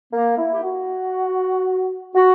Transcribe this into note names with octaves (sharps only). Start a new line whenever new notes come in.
A#3
E4
G4
F#4
F#4